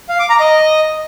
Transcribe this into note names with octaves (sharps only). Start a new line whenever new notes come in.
F5
D6
A#5
D#5